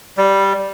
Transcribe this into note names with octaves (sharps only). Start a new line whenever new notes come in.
G3